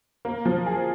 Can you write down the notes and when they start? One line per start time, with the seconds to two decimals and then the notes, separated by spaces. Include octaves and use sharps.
0.25 A#3
0.45 F3
0.66 G#4